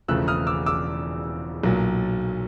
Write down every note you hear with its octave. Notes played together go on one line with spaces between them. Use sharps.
E1 E2 C#3 F3 A3 E6 F#6
D#6 F6
D6 E6
D6 E6
B1 A#2 F#3